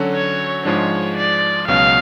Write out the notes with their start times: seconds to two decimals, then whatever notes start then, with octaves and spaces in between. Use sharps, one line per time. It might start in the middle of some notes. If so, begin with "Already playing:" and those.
Already playing: D3 F#3 C#4 F#4 A4
0.15 C#5
0.65 G#2 F3 G#3 D4 C#5
1.17 D5
1.68 C#2 B2 F#3 C#4 F5